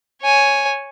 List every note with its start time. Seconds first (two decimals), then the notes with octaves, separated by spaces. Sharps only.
0.22 C#5 G#5